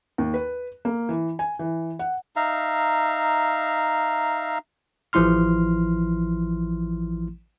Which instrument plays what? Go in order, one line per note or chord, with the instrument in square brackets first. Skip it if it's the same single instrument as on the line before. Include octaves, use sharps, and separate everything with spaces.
[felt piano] D#2
B4
A#3
E3
G#5
E3
F#5
[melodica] D#4 E5 F5 A#5
[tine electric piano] A1 E3 F3 E4 C6 F6